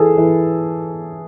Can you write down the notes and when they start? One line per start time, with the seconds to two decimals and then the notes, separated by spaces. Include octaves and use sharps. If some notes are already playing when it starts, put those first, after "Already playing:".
Already playing: E3 G#4 A4
0.18 E3